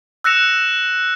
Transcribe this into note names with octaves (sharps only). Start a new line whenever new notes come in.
E6 F#6 A#6 C#7 E7 F7